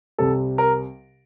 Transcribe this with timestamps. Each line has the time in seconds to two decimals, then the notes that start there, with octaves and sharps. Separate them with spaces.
0.18 C2 C3 G3 A4
0.58 A#4